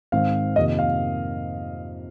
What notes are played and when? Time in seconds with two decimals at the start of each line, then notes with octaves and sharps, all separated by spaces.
0.12 G#2 D#3 C4 F5
0.56 F2 C3 D#3 A#3 D#5
0.79 F5